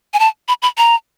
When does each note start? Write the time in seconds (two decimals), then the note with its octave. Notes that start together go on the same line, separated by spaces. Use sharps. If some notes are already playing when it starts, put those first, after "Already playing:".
0.14 G#5
0.19 A5
0.48 B5
0.62 B5
0.78 A#5